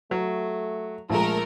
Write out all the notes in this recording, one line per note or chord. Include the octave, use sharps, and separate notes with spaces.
F#3 A3
A#1 G#3 A3 A#4